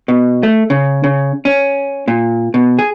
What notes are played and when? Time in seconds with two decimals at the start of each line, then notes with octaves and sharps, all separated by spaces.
0.08 B2
0.43 A3
0.70 C#3
1.04 C#3
1.45 C#4
2.08 A#2
2.54 B2
2.79 G#4